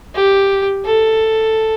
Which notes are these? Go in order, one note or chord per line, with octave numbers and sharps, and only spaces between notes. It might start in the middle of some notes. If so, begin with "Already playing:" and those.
G4
A4